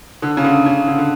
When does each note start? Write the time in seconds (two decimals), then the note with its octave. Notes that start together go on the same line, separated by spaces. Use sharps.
0.22 D3
0.37 C#3
0.44 D3
0.66 C#3
0.87 D3
0.98 D3